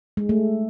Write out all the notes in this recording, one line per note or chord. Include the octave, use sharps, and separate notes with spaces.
G#3
A3